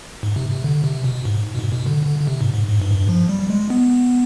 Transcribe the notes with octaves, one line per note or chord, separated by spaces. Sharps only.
G#2
C3
C3
D3
C3
B2
G#2
B2
G#2
B2
D3
D3
D3
C3
G#2
G#2
G#2
G2
G#2
G2
F3
G3
G#3
B3